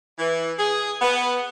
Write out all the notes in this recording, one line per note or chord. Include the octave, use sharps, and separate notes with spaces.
E3
G#4
B3